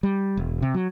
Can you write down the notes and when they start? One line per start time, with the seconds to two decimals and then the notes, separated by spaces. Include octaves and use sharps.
0.03 G3
0.37 E1
0.62 C3
0.74 F#3